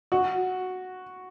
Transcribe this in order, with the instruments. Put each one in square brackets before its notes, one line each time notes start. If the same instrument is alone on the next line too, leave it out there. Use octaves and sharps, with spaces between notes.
[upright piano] F#4